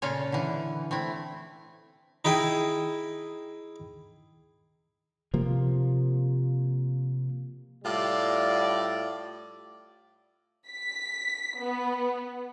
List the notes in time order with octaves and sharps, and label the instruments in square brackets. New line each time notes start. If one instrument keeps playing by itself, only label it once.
[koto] A#2 C#3 F4 A4 C#5
D3 E3
A3 C4 E4
[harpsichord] D#4 E4 G#4 G5
[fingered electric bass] C3 F3 A#3
[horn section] A2 G3 F4 D5
[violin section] B6
B3